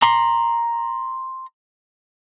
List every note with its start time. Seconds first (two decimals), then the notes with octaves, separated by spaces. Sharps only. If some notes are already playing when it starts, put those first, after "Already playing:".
0.02 A#5 C6